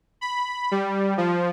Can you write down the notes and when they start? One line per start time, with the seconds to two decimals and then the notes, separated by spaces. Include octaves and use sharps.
0.21 B5
0.71 G3
1.17 F3